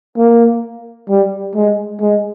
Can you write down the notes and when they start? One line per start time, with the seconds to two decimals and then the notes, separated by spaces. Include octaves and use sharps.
0.18 A#3
1.09 G3
1.55 G#3
2.01 G#3